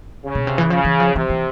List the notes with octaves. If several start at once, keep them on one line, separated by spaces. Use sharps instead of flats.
C#3
B2
C3
E3
C#3 F3
E3
F3
C3 E3
E3